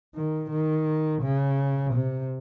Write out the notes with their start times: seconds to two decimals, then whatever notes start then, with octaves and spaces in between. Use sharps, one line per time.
0.15 D#3
0.51 D#3
1.22 C#3
1.93 C3